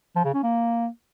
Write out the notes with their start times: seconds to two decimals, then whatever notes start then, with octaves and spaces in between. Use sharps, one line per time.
0.16 F3
0.25 C#3
0.34 C#4
0.43 A#3